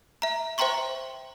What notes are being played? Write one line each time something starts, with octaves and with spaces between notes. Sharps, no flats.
E5 A#5
C5 E5 G5 A#5 C6 C#6